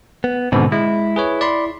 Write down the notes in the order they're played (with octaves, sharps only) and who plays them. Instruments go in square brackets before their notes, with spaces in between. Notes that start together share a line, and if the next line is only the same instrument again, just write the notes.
[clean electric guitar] B3
[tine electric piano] G#2 B2 D3 [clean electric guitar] D#3 B3 C4
[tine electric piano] G#3 [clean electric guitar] E4
[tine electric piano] G#4 B4 C#5
D5 B5 C6